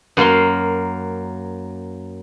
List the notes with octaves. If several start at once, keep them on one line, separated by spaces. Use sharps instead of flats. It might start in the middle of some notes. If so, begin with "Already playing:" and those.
F#2 A#3 F5 C6